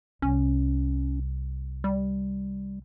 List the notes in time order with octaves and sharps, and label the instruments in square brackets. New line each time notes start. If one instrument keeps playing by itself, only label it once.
[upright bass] C2 [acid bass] C#4
[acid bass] G3